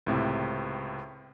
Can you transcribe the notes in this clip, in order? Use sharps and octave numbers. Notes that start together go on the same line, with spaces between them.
C#2 A2 C3